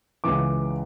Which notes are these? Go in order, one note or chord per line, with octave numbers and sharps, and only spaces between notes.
C#2 C#3 E3 D6